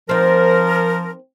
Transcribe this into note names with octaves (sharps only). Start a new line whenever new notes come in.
F3 C4 D#4 A#4